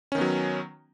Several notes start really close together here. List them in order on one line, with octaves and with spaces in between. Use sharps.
C#4 D#3 B3 F#3